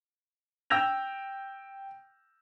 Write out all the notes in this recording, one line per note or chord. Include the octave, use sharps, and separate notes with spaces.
G5 E6 G6 A#6 F7